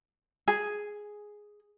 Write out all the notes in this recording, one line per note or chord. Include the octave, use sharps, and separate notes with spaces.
G#4